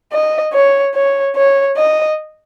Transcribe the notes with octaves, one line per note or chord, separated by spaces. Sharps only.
D#5
C#5
C#5
C#5
D#5